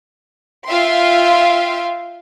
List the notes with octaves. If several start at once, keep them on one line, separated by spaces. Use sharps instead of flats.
F4 E5 F5 G5 C6